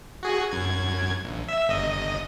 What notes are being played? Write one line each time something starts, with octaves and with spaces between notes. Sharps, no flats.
F#4 G#4
F#2 G#6
A#1
E5
G1 D#5